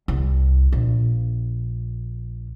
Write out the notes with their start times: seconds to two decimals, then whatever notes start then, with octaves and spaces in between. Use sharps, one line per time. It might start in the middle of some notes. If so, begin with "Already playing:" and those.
0.08 C2
0.72 A#1